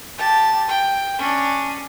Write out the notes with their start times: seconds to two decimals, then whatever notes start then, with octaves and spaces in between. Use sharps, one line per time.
0.18 G4 A5
0.68 G5
1.18 C#4 D4